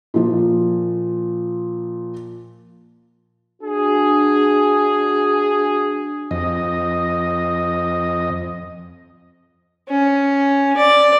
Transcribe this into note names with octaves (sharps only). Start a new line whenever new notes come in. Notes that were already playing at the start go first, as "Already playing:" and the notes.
A#2 F3
D4 F#4 G#4
F2 D#5
C#4
D5